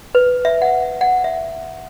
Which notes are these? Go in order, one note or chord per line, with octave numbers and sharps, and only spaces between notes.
B4
E5
F#5
F#5
E5